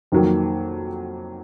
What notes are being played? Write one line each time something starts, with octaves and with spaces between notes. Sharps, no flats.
F2 D#3 F#3 A#3